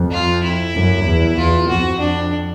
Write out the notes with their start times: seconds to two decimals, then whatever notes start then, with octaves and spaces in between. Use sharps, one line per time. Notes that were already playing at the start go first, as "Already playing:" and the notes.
Already playing: F2
0.11 F4
0.43 E4
0.74 F#2
1.06 E2
1.37 E2 F4
1.69 F2 F#4
2.00 D4